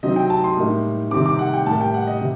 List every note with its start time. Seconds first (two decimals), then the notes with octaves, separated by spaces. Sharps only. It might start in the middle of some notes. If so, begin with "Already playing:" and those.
0.03 C3 F#3 C4 D#4 D#5
0.16 G5
0.30 A5
0.44 C6
0.57 A2 G3 A#3 D#4
1.11 C3 D#3 G3 C4 D6
1.26 D6
1.39 F#5
1.53 G5
1.66 A2 G3 A#3 A5
1.81 G5
1.94 F#5
2.07 D#5
2.21 C3